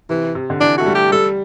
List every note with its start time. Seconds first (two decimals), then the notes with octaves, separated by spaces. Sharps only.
0.09 C3 E3
0.35 C3
0.50 D3
0.61 E3 D4
0.78 A3 F#4
0.86 G3
0.95 G4
1.12 G3 A4